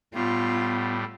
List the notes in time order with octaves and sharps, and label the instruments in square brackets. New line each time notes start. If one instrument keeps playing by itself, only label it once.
[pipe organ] A2 G3 [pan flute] B3 [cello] F4